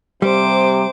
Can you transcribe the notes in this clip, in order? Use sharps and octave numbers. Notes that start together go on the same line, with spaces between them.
C3 G3 C5 D6